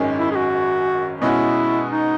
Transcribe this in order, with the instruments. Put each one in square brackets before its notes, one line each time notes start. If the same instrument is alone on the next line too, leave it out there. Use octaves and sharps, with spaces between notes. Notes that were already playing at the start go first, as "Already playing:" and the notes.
Already playing: [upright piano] G#1 F#2 D#3 G#3 C#4
[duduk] E4
G#4
F#4
[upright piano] B2 G#3 C#4 F#4 [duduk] E4
[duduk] D#4